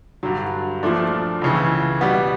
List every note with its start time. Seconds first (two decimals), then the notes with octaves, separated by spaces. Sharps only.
0.23 G2 D3 F#3
0.83 A#2 F3 A3 D4
1.41 C#2 C#3 E3
2.01 B2 G3 B3